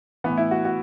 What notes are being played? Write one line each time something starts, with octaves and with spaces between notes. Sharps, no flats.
A2 E3 B3
E4
F#4
F#4